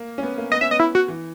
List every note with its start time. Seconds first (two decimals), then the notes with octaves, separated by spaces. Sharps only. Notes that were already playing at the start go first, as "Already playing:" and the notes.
Already playing: A#3
0.18 C#4
0.23 B3
0.38 A#3
0.51 B3 D#5
0.61 C#4 E5
0.71 B3 D#5
0.80 E4
0.95 F#4
1.08 E3